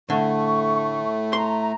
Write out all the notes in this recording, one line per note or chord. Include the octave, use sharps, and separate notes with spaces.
A2 D3 A3 C#6
A#5 C6